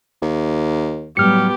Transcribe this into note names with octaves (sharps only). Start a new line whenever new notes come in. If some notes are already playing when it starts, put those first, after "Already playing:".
D#2
A2 F#3 G3 B3 G4 F6 C#7